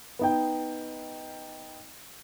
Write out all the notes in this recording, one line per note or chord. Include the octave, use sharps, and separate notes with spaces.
B3 D#4 G5